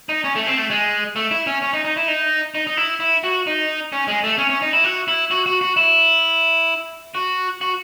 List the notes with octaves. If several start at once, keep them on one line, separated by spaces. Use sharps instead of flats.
D#4
C#4
A3
C4
A3
G#3
A3
E4
C#4
C#4
D#4
D#4
E4
D#4
D#4
D#4
E4
E4
F#4
D#4
C#4
G#3
A3
C#4
C#4
D#4
E4
F#4
E4
F#4
F#4
F#4
E4
F#4
F#4